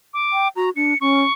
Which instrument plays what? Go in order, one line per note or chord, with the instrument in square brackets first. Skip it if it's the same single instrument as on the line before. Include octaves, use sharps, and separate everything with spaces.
[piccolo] D6
[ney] G5
[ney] F#4 [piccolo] A#5
[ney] D4 [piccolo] C#7
[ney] C#4 [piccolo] C#6